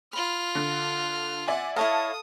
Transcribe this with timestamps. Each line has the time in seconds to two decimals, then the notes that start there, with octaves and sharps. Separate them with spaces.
0.13 F4 B5 F6
0.55 D3
1.48 D5 E5 F#5 G#5
1.76 E4 A4 C#5 D#5 F5 A5 D#6